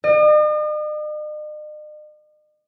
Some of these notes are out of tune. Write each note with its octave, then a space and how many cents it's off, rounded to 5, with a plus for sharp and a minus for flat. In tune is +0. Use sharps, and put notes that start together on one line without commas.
D#5 -45